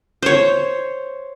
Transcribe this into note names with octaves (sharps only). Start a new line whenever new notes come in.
C5 C#5